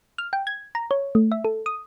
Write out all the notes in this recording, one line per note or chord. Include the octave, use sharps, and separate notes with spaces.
F6
G5
G#6
A#5
C#5
A3
E5
A4
D#6